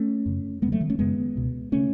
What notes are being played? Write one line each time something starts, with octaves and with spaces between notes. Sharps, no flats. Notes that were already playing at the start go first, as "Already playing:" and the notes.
Already playing: A3 C#4
F#2 C#3
E2 C#3 G#3 B3
F#3 A3
D#3
A3 C#4
F#2 C#3 G#3 B3
C#2 B2
C#3 A3 C#4